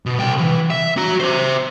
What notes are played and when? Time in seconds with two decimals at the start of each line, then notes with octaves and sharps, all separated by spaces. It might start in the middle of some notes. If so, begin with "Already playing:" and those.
0.06 B2
0.19 C2 G5
0.37 B2 E3
0.70 E5
0.97 F#4 A#5
1.20 C5 E5